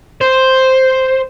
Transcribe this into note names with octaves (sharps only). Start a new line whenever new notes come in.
C5